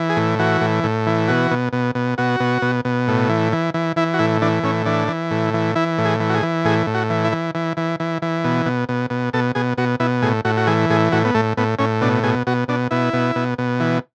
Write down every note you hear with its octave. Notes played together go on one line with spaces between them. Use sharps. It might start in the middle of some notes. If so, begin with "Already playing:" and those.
Already playing: E3
G#4
A2
E3 F#4
A2
A2
E3
B2 F#4
B2
B2
B2
B2 F#4
B2
B2
B2
A2
E3
E3
E3
E3 E4
F#4
A2 E4
E3 D4
A2 C#4
E3 D4
E3
A2
E3
E3 E4
A2
G#4
E3
F#4
G#4
E3
A2 G#4
A2
F#4
E3
E4
E3
E3
E3
E3
E3
B2
B2
B2
B2
B2 A4
B2 G#4
B2 F#4
B2 E4
A2 G#4
A2 F#4
F#4
E3 G#4
A2 G#4
A2 F#4
B3
A2 A3
A2 B3
A2 C#4
B2 D4
B2 G#4
B2 F#4
B2 D4
B2 E4
B2
B2
B2
E3